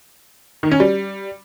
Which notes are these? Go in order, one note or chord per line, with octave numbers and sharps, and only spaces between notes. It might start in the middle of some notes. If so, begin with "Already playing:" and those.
D#3
C#4
G3